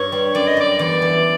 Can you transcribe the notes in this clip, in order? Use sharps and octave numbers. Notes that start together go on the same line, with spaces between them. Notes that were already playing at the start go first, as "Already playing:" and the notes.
Already playing: G2 C#5
G3
F#2 D5
D#5
G3 D5
E2 D5
E3